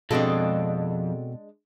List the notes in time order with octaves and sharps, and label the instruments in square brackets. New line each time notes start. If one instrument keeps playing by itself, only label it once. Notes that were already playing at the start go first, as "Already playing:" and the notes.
[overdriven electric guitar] F2 [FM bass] B2 [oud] G#3 D4 D#5 [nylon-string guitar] C4 F#4 A4